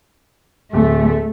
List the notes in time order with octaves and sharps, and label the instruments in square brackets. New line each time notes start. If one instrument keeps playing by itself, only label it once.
[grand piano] D1 [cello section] A3